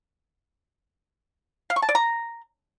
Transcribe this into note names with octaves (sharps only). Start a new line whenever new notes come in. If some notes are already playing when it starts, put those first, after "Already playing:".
F5
C#6
A5
D5
A#5